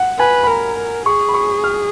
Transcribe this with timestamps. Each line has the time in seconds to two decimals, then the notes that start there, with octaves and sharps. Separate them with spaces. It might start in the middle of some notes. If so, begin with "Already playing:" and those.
Already playing: F#5
0.19 B4 G#5
0.43 B5
0.47 A#4 A#5
1.06 G#4 C#6
1.29 B5
1.34 C#6
1.64 F6